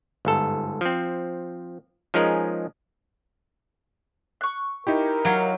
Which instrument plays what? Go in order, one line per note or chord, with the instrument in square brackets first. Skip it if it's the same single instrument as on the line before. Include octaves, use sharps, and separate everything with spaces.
[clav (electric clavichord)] G1 G#2 A4
F3 C4
F3 G#3 C#4 D#4 G#4 A#4
[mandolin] C#6 F#6
[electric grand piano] D#4 E4 G4 [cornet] A#4
[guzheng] F#3 [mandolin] C#5 F5 F#5